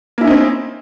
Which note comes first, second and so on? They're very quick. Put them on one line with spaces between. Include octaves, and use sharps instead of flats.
A#3 E4 C#4 D#4 C4